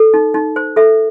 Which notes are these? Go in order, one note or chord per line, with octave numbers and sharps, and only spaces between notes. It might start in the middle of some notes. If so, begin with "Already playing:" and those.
Already playing: A4
D#4
D#4
C5
A4 E5